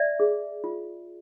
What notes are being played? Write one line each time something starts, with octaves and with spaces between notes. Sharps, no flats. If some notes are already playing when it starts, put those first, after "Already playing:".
Already playing: D5 E5
G#4
F4